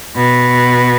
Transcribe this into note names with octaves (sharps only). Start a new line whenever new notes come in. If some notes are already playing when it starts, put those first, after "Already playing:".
B2